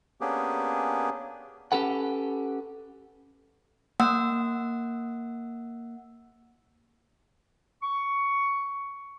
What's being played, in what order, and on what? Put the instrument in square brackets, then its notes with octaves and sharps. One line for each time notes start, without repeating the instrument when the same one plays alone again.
[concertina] A#3 B3 C#4 D4 G4 G#4
[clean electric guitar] C#4 G4 A4 B4 F#5
[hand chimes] A#3 F#5 E6
[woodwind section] C#6